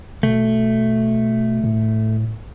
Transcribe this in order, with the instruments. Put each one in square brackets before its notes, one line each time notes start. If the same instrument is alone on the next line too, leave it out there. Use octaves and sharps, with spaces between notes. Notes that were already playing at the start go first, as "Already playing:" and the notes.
[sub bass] B2 [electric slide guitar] A3
[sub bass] A2